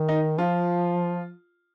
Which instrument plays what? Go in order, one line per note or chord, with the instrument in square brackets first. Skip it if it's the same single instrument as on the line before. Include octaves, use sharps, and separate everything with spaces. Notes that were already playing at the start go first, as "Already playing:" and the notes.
Already playing: [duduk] D#3
[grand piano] D#4
[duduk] F3 [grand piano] F4